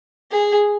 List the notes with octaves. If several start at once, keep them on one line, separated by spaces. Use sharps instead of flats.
G#4